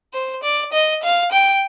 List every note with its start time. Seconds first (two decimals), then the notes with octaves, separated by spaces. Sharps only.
0.13 C5
0.43 D5
0.73 D#5
1.03 F5
1.31 G5